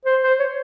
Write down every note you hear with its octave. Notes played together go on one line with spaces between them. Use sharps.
C5
C5
C#5